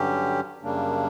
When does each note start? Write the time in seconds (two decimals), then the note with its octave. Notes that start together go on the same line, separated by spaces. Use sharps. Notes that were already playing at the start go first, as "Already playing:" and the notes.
Already playing: G2 D3 F#3 C#4 G4
0.62 F#2 C#3 G3 A#3 D4